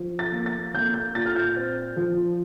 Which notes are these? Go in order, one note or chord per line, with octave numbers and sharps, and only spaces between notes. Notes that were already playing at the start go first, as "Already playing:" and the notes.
Already playing: F3
A6
A#3
A6
A#3 G6
G6
A#2 A6
F6
G6
C4
F3